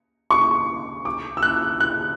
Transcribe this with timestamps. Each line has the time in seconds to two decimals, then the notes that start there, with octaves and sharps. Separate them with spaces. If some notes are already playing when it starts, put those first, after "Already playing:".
0.30 C#6
1.05 D6
1.37 E6
1.43 F#6
1.80 F#6